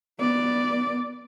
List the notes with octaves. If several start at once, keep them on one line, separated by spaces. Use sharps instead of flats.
B3 D5